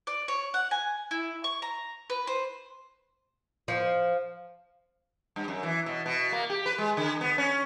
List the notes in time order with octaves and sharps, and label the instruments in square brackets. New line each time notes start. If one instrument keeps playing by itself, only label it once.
[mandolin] D5
C#5
F#5
G#5
E4
C#6
A#5
B4
C5
[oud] F3
[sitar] G2
F#2
E3
B2
B2
A#3
G4
B4
G#3
D3
B3
C#4